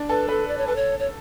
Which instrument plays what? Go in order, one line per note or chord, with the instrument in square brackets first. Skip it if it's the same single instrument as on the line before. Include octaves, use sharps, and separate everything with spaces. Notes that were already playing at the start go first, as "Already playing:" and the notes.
Already playing: [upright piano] D4
[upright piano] A4 [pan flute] B4
[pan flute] A4 [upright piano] B4
[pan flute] D5
C#5
[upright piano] A4 [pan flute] B4
[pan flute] C#5
C#5